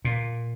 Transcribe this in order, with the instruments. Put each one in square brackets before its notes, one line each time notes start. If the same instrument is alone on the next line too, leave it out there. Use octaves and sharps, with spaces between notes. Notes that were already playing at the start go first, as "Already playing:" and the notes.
[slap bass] A#2